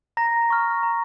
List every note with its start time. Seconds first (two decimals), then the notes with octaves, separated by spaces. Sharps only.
0.17 A#5 A#6
0.50 C#6 F6
0.83 A#5